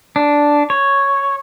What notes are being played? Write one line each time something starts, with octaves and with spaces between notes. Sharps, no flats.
D4
C#5